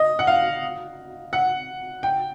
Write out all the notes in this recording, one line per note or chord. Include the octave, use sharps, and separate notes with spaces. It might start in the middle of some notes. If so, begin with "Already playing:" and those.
Already playing: D#5
F#5
F5
F#5
G5